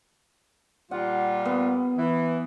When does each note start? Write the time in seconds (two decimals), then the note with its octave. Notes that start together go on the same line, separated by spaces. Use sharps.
0.91 A#2 G3 F4 F#5
1.45 B3
1.98 E3